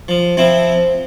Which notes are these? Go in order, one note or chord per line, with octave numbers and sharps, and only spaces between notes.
F3
F3 C4 E4